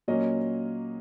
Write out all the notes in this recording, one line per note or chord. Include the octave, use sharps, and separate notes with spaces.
A#2 F#3 A#3 C#4 D#5